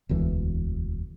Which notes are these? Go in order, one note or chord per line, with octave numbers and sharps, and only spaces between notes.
E1 D2 E3